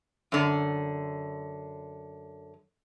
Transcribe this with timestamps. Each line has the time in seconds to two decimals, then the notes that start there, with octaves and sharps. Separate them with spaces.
0.32 F#2 D3